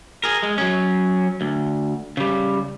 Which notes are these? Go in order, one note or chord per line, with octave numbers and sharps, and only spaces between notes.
G#4 A#4
G#3
F#3 C#4
D2
C#3 G3